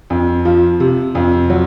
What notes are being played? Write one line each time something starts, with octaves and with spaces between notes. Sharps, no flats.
F2
F3
C3
F2
F#3